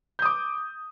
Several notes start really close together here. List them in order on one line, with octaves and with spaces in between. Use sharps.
G6 D#6 D6